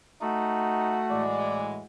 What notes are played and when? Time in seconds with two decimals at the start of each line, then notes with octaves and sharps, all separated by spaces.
0.21 A3 D#4 F#4
1.10 A2 E3 G#3 D5